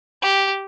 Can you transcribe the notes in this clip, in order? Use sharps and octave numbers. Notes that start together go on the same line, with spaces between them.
G4